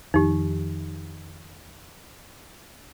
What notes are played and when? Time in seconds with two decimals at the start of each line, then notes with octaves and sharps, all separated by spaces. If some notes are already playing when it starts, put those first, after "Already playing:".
0.14 F2 D#3 D#4 G4